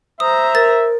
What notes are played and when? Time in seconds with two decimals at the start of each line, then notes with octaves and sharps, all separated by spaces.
0.20 C5 E5 A#5 D#6
0.55 A#4 A6